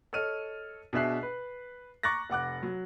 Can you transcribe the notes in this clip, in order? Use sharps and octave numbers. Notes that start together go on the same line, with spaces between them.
A4 C#5 D#5 F6 D#7
B2 D4 G#4 E5 F#6 C7
B4
A#5 C#6 D6 F#6 A6 A#6
F1 F#5 D6 F#6
F#3